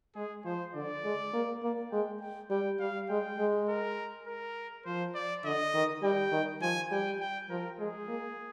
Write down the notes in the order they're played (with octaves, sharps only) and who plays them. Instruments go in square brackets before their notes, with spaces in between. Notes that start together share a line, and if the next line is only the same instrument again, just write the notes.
[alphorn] G#3 [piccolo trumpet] G#4
[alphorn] F3 [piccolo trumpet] C5
[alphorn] D3 [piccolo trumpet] D5
[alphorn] G#3
A#3
A#3
[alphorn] G#3 [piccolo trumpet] G5
[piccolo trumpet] G5
[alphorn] G3 [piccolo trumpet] G5
[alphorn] G3 [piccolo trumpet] F5
[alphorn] G#3 [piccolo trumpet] G5
[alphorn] G#3
[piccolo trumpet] A#4
A#4
[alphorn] F3 [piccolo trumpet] C5
[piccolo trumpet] D5
[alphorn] D3 [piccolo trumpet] D#5
[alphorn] D#3
[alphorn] G3 [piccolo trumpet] G5
[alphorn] D#3
[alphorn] F3 [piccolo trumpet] G#5
[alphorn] G3 [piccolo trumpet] G5
[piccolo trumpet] G5
[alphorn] F3 [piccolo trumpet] A#4
[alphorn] G#3 [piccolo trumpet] G#4
[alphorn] A#3